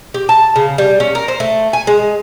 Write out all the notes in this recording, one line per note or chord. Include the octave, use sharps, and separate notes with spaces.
G4
A5
C#3
G3
C#4
A#4
C5
A3
G#5
G#3